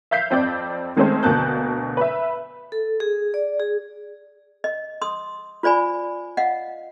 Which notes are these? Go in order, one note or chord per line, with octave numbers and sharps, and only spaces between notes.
E5 F5 G6 B6 C7
F2 C4 D5 G6
D#3 G#3 A3 C4 C#4 C5
D2 B2 A#3 A5 F#6 G6
B4 E5
A4
G#4
D5
G#4
D#5
C6 D#6
F4 C5 D5 G#5 B5
D#5 F5 F#5